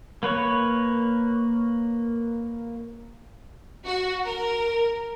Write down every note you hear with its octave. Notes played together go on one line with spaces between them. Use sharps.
A#3 B4 C#5
F#4
A#4